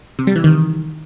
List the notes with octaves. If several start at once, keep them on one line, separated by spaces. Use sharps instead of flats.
C3
G3
E3
D#3